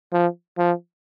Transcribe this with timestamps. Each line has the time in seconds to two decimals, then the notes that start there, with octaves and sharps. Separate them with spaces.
0.13 F3
0.58 F3